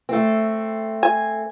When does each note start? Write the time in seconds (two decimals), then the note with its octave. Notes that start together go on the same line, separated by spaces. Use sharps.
0.09 A3 C4
1.03 G#5